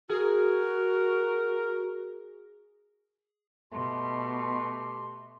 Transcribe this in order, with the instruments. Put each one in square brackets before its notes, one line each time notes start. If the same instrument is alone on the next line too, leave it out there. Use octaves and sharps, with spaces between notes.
[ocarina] F#4 [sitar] G#4 [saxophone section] A#4
[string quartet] B2 [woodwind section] A3 G4 C6